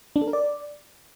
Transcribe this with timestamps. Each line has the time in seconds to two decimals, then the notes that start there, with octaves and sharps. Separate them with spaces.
0.16 D4
0.22 A4
0.27 A#4
0.33 D5